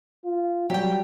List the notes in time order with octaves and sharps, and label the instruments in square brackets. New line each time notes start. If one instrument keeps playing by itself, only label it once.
[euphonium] F4
[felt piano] F#3 [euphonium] G3 [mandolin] G4 G5